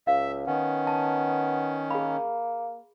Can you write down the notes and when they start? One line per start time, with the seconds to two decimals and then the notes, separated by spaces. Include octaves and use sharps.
0.07 C#2 E5 F5
0.47 D#3 B3 C#4
0.87 A5
1.91 A#3 G#4 B5